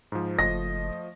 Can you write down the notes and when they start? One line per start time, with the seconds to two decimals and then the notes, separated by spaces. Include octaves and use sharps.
0.12 G#2 F3
0.39 F#1 F3 A3 D#5 A#6